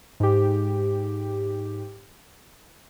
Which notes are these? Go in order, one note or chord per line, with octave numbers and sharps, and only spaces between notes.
G#2 G4